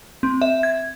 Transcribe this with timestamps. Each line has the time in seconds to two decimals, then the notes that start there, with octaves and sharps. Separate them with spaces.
0.23 C4
0.42 E5
0.63 G#6